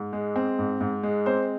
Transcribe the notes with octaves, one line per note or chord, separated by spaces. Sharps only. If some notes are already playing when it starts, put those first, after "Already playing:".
Already playing: G#2
G#3
C4
G#2
G#2
G#3
C4 C5